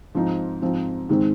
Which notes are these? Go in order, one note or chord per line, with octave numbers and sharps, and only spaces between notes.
G#2 F3 C4 D#4
G#2 F3 C4 D#4
G#2 D#3 G#3 C4